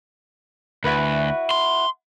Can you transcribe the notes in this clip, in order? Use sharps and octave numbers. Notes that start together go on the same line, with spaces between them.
D2 E4 F#4 B4
C6